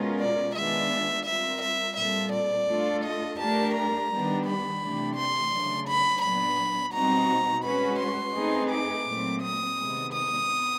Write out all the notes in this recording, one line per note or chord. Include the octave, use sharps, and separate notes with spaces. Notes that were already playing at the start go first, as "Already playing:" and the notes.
Already playing: B2 G#3 C#4 F4 A#4
D5
D#3 G#3 B3 D4 F4 E5
G3 C4 F4 A#4 E5
E5
A#2 G3 C4 F4 A4 E5
D5
A3 D4 F4 A4
D#5
A3 D4 G4 A#4 A5
A#5
D#3 G3 B3 D4 G4
B5
C3 E3 A3 D4 G4
C6
C#3 F#3 A3 D4
B5
A#2 F#3 B3 D4 B5
B2 G3 C4 D#4 F#4 A#5
G#3 C#4 F#4 B4 B5
C6
A3 C4 D#4 G#4 B4
D6
A#2 F#3 A3 C4
D#6
C3 D#3 G#3 B3
D#6
B3